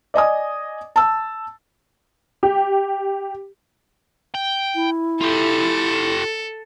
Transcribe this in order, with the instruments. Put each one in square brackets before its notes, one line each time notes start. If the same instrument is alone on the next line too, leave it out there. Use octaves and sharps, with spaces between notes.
[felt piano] D5 D#5 G#5 D#6
A5 E6
[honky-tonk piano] G4
[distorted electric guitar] G5
[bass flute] E4
[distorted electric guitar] F4 G4 [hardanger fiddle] A4